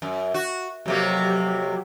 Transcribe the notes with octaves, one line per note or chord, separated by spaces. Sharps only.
F#2
F#4
F2 C3 F#3 A#3 G4